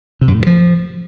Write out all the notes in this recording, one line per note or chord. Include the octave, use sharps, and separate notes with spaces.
C3
F#2
A2
G2
F3